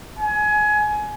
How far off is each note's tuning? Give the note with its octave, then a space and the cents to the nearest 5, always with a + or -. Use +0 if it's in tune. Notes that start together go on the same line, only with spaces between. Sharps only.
G#5 +25